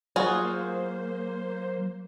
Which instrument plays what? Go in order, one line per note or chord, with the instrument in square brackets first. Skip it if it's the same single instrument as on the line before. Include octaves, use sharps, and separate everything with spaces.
[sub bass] F#3 [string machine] A#3 C5 [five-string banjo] F4 F#4 G#4